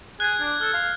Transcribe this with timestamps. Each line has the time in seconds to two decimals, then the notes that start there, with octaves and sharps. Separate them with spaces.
0.20 G#4 F#6 G#6
0.41 D4
0.61 A4 F6
0.74 F5